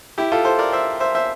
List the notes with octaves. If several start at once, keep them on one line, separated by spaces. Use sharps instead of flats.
E4 G4
F4 A4
A4 C5
A#4 D5
C5 E5
C5 E5
C5 E5